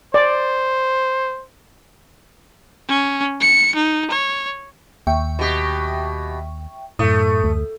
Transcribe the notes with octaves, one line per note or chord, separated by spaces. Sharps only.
C5 D5
C#4
C#7
D#4
C#5
D#2 E5 G5 C#6
B2 G4
F#2 A2 A3 D#6
D2